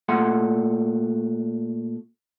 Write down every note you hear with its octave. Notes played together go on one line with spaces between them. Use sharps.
A#2 A3 F#5 C6